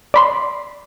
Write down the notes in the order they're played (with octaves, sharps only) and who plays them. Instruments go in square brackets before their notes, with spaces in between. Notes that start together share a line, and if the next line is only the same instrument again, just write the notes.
[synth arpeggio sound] D5 B5 C6